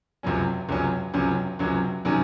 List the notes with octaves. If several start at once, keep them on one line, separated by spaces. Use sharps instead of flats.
C#2 C3 F#3 C#4
C#2 C3 F#3 C#4
C#2 C3 F#3 C#4
C#2 C3 F#3 C#4
C3 D#3 F#3 C#4